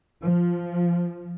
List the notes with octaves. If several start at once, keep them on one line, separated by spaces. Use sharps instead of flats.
F3